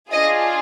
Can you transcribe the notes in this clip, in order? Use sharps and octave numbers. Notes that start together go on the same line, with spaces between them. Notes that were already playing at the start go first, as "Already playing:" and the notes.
D4 F4 G#4 D#5